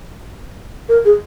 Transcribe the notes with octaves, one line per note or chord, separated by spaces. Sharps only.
A#4
G#4